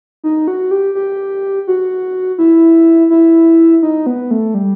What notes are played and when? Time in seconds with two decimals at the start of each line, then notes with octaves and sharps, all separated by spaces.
0.24 D#4
0.48 F#4
0.71 G4
0.95 G4
1.67 F#4
2.38 E4
3.10 E4
3.83 D#4
4.06 B3
4.31 A3
4.54 G3